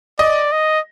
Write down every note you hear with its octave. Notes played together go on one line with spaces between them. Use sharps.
D5 D#5
D#5